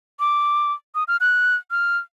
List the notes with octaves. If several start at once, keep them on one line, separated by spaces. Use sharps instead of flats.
D6
D#6
F6
F#6
F6